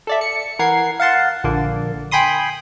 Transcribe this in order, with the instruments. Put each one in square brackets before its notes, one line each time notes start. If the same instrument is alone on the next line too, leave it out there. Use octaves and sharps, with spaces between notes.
[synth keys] A4 D5 E5
C#7
E3 A#4 F#5 G#6 C7
F5 F#5 A5 C6
A#1 D3 A#3
G5 G#5 B5 C6 D#6